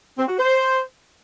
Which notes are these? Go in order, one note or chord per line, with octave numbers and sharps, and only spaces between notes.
C4
F#4
C5